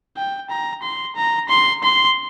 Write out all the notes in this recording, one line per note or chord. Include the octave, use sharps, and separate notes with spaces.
G5
A#5
C6
A#5
C6
C6